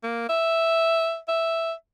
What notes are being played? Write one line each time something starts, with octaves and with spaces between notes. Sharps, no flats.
A#3
E5
E5